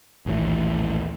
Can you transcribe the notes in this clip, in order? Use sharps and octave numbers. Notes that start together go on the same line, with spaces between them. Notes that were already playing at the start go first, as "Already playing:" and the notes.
A#1 D#2 A2 E3